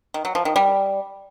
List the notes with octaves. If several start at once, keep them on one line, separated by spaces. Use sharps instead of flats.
D#3
F#3
F3
D#3
G3